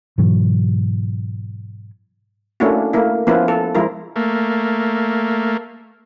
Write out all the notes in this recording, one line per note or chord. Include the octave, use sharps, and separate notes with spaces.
G#2 B2 E3 F#3
A3 A#3 C#4 D4 E4 F#4
A3 A#3 E4
F3 A#3 B3 C#4 E4 B4
A4
F3 G#3 E4 F4 A#4
A3 A#3